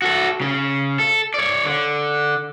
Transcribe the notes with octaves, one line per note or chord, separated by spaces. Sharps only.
F#4 A4
C#3
A4
C#5 D5
D3